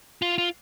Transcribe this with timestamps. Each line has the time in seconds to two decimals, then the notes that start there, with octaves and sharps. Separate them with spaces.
0.22 F4
0.38 F4